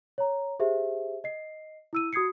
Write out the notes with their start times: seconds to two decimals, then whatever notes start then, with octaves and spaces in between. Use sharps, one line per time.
0.18 C#5 A#5
0.60 G4 G#4 C5 E5
1.24 D#5 C7
1.93 E4 E6 D#7
2.13 F#4 D#6 G#6 C7 C#7